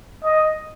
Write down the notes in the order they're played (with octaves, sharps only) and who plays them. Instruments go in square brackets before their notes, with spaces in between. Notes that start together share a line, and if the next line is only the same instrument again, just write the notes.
[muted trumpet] D#5